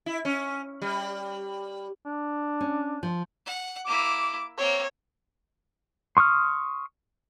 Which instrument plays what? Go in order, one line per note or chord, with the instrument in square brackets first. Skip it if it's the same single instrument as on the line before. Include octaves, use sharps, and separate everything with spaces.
[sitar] E4
C#4
G3
[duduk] D4
[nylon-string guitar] C#4
F3
[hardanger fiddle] F#5
[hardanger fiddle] A#3 E4 [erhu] D6
[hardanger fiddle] A#3 C4 [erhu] C#5
[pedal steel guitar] C6 C#6 D#6 F6